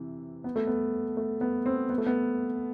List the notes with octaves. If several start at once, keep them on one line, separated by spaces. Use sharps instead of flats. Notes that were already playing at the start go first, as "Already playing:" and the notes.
Already playing: C3 E3
B3
A3
B3
A3
B3
C4
B3
A3
B3